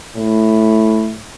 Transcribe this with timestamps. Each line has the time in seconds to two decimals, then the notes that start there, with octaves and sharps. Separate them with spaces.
0.16 A2